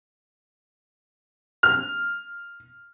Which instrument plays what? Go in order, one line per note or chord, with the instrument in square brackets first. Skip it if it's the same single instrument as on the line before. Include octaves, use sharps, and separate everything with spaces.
[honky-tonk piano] F6